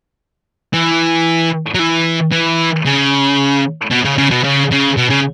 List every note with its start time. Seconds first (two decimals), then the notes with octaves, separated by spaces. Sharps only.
0.74 E3
1.74 F#3
1.79 E3
2.32 E3
2.85 C#3
3.91 B2
4.05 C#3
4.18 C#3
4.31 B2
4.44 C#3
4.71 C#3
4.97 B2
5.10 C#3